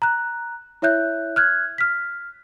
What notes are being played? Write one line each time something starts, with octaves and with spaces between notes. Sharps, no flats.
A#5 F#6
E4 C#5 E5 F#6 G6
F6 F#6 G#6
F6 B6